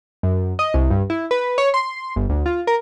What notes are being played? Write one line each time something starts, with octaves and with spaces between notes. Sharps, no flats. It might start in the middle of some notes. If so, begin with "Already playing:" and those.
F#2
D#5
C2
G2
E4
B4
C#5
C6
G1
D2
F4
A#4